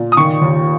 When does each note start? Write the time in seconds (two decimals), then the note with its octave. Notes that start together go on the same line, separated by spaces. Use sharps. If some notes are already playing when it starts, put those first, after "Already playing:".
Already playing: A#2
0.12 D#6
0.17 D#3 C#6
0.41 D#2